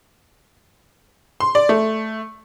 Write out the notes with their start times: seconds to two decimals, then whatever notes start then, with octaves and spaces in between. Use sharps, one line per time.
1.40 C6
1.55 D5
1.69 A3